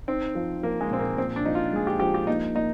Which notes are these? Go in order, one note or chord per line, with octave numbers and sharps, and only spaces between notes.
C4 D#4
F3
F3 A#3
G#3
A#2 C4
A#3
A#2 C4
D4
F3 D#4
F4
G#3 G#4
G4
F3 G4
G4
A#3 D#4
A#3 D#4